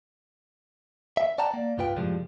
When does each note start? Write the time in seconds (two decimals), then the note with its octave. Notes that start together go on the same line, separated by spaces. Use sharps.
1.17 E5
1.38 D5 F#5 G5 A5 A#5
1.51 A#3 D5
1.78 C2 G2 F4 B4 G5
1.96 F#2 A2 C3 F3 G3 G#3